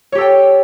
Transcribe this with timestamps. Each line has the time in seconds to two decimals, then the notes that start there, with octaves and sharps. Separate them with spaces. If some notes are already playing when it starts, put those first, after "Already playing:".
0.12 C#5
0.15 G4
0.18 A4
0.21 G5